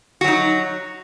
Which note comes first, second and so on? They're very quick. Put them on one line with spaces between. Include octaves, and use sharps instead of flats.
F#4 F#3 D#4